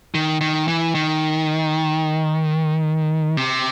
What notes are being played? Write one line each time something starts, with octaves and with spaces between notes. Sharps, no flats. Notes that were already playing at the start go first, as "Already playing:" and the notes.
D#3
D#3
E3
D#3
C3